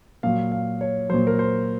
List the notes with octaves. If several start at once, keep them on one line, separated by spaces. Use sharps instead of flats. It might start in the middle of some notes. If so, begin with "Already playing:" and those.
A#2 F#3 F5
F5
C#5
A#2 F#3 C5
A#4
C5